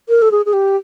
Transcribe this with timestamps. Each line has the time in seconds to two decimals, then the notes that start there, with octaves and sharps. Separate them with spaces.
0.09 A#4
0.22 A4
0.31 G#4
0.46 G#4
0.53 G4